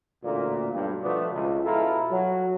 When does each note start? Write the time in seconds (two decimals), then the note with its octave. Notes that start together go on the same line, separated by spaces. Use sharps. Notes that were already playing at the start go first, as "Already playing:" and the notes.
0.23 A1 D2 A#2
0.73 B1 G2
1.03 B2 F3 A3 B3 D4
1.32 C#2
1.64 B2 E4 F4 A4 A#4
2.11 F#3